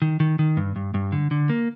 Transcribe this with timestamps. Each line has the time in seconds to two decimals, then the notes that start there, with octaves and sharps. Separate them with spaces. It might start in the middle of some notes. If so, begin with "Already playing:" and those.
0.02 D#3
0.20 D#3
0.39 D#3
0.57 G2
0.76 G2
0.94 G2
1.12 D3
1.31 D3
1.49 A#3